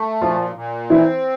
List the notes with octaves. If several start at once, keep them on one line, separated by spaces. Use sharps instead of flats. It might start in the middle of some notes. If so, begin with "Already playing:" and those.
Already playing: A3
A#2 F3 F4
A#2
E3 C4 E4